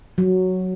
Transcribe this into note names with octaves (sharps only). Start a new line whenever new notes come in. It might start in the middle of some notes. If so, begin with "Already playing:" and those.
F#3